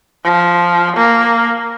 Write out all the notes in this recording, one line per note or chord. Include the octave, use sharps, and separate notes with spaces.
F3
A#3